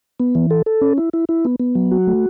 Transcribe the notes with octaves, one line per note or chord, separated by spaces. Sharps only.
B3
E3
A4
A4
C#4
E4
E4
E4
B3
B3
F#3
F#4
A3